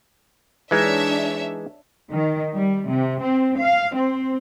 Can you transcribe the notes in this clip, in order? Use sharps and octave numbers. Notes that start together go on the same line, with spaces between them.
E3 G#3 D4 D#4 C#5 E5
D#3
G3
C3
C4
F5
C4